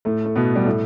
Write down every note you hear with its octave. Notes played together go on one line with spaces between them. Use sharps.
A2 A3
A3
B2 B3
G3
A2 A3